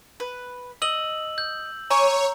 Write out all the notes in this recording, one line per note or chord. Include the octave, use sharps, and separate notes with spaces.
B4
D#5 E6 F#7
G6
C#5 G#5 A#5 C#6 D6